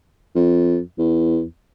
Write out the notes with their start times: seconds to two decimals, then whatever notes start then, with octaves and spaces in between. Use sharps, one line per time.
0.35 F2
0.99 E2